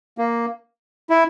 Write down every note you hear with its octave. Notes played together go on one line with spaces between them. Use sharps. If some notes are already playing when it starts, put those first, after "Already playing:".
A#3
E4